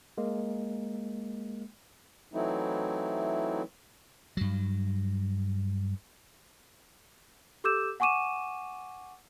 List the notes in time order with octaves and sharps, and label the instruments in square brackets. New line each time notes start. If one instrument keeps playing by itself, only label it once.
[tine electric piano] G#3 A#3
[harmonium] E3 F#3 A3 C4 D#4 E4
[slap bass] G2 F#3
[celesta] G4 A4 D6 E6 G6 E7
F#5 G#5 C#6 D6 D#7 E7